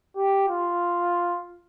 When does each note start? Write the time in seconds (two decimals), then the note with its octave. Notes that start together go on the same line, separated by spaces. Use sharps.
0.17 G4
0.48 F4